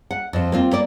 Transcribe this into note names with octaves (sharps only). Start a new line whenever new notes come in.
F#5
F2 C5
A#3 C4 F4
A#3 D5